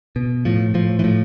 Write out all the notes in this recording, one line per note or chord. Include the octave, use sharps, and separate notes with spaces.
B2
A2 F3
A2 F3
E3
A2 F3